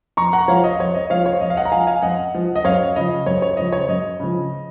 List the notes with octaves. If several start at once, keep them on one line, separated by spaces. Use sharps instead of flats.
F2 A#5 C#6
F#5 A#5
F3 C#5 F5
D#5
F2 C#5
D#5
F3 C#5 F5
C#5
F2 D#5
F5
D#5 F#5
A#5
F3 F5 G#5
F5 G#5
F2 D#5 F#5
F3
D#5
F#2 C#5 F5
C#3 F3 D#5
F#2 C#5
C#5
C#3 F3 D#5
C#5
F#2 D#5
C#3 F3